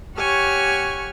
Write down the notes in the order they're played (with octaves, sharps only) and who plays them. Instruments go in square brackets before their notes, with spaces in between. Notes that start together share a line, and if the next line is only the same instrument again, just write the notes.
[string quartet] G4 C#5 F#5 G#5 C#6 F6